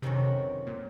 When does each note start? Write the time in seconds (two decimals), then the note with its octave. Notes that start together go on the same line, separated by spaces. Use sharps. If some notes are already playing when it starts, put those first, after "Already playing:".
0.02 F2 C3 D#3 F#3 C#4 F#4
0.67 A#2